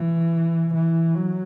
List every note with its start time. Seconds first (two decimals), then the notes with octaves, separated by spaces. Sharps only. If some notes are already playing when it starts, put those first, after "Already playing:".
Already playing: E3
0.74 E3
1.15 F#3